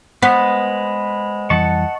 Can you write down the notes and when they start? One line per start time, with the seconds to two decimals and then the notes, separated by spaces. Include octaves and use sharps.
0.23 G#3 B3 B4 C5 F#5
1.50 F2 E3 G3 D#5 F#5 A5 C#6